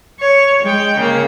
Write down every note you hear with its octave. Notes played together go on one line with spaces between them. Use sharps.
C#5
G#3 G5
C#3 A#3